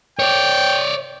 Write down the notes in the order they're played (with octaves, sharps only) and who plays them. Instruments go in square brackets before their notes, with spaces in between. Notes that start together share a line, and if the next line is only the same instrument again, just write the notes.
[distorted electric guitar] C#5 D5 [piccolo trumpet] G5